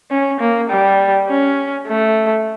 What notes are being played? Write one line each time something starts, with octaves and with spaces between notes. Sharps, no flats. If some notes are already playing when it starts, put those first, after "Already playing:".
C#4
A#3
G3
C#4
A3